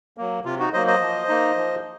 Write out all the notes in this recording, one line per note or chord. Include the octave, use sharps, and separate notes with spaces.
F#3 A#3
C3 F4
D#4 F#4
F#3 A#3 C5 D#5
C5 D#5
F3
A#3 D#4
F3